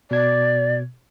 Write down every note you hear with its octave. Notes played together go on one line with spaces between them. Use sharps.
B2 D5 G#6